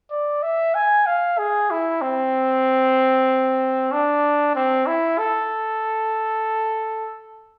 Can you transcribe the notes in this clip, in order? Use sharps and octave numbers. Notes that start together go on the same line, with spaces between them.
D5
E5
G#5
F5
G#4
E4
C4
D4
C4
E4
A4